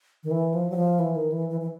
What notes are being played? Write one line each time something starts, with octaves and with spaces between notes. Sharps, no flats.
D#3
E3
F3
F#3
F3
E3
D#3
E3
E3
E3